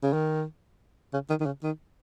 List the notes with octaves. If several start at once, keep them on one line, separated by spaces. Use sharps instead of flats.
C#3
D#3
C#3
D#3
D#3
C#3
D#3